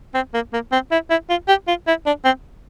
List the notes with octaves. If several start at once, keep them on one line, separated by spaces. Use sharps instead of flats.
C4
A#3
A#3
C4
E4
E4
F4
G4
F4
E4
D4
C4